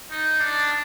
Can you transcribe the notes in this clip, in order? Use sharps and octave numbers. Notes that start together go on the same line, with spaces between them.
D#4
D4